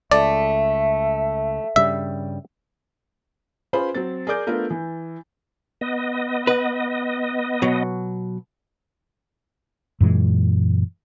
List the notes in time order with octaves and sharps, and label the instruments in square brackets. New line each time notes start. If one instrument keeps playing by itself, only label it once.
[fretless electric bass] C#2 [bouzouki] A3 [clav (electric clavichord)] D5 [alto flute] E5
[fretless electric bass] G2 C#3 G3 [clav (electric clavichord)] E5
[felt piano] C#4 F4 G#4 B4 C5 B5
F#3 C4 A6
G#4 A#4 D5 D6 G6
A3 B3 D4 F4 A#4
E3
[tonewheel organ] B3 D#5
[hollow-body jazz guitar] B4
B2 F#3
[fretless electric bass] F#2 A#2 E3 G#3